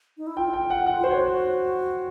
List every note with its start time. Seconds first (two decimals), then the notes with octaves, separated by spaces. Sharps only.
0.17 D#4
0.27 E4
0.37 F4 G5
0.53 G5
0.70 F#5
0.86 F#5
0.95 F4
1.04 F#4 C5
1.10 C#5